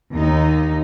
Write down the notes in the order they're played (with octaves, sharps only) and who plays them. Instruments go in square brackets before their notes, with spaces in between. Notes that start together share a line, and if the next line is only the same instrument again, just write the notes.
[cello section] D#2 D#4